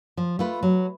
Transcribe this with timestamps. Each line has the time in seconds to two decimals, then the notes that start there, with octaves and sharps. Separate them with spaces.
0.17 F3
0.39 A3 F4 B4
0.63 F#3